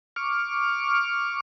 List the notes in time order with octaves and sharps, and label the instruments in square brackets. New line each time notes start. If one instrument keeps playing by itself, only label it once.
[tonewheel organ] C#6 D6 F6